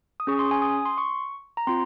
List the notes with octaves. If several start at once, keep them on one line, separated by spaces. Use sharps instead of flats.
D#6
C#4 G#4 C#6
C6
G#5
D#6
C6
C#6
A#5
C4 F4 C6